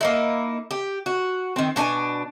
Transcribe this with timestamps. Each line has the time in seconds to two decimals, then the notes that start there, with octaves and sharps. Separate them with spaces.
0.01 A#3 D#4 E4
0.71 G4
1.06 F#4
1.56 D#3 C4
1.76 B2 D4 G#4 G#5